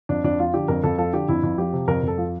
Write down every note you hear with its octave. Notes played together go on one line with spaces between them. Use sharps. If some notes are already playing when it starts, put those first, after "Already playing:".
F2 D4
F2 D4
F3 F4
D3 G4
F2 A#4
F2 A4
F3 A4
D3 G4
F2 E4
F2
F3 G4
C3
F2 A#4
F2 A4
F3